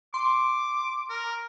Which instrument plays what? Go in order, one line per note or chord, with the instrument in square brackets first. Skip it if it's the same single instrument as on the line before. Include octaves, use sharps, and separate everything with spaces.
[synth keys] C6 [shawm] D6
[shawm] A#4